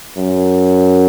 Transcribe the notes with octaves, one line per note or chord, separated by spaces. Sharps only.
F#2